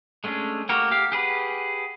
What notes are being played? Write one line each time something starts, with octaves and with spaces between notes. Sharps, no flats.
G#3 A3 C#4 D4
A3 A#3 F#4 G4 A#4
G4 F5
G4 G#4 B4 F#5